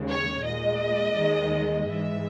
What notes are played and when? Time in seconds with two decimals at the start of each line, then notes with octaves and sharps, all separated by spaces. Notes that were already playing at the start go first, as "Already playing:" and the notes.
Already playing: D#2 C#3 G#3
0.10 C#5
0.44 A#2 G#3 D#5
1.16 D#2 D#3 G#3
1.87 G#2 E3 G#3 E5